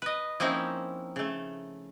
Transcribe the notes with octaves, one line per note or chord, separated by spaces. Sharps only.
B4 D#5
F3 A#3 C4 C#4 D#4 E4
C#3 A3